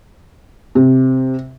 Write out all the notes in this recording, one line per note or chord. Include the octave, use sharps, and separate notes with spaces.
C3